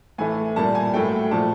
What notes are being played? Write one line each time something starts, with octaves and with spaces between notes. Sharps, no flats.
A2 E3 A3 G#5
A#2 G3 A#3 A5
G#5
A2 F#3 A3 G5
A#2 F3 A3 A5